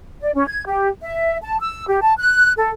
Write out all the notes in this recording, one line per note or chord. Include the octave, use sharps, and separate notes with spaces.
D5
C#4
G#6
G4
E5
A5
E6
G4
A5
F#6
A4